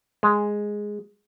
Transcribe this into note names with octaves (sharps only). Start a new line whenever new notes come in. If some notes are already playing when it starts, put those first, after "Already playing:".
G#3